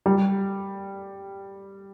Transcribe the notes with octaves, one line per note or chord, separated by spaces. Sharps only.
G3